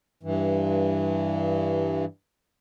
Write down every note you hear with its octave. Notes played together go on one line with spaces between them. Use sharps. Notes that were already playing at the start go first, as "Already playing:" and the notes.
G2 E3